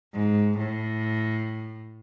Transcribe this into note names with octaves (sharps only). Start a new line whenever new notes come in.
G#2
A2